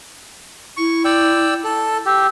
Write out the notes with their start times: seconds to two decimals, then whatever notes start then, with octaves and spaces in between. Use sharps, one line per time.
0.77 E4 C#6
1.05 D5 G5 E6
1.64 A4
2.06 G4 E6